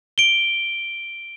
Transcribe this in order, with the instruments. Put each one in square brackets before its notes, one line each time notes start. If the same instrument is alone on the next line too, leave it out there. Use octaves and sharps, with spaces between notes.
[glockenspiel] D7 G7